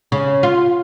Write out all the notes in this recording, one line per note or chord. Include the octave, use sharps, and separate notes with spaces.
C#3
F4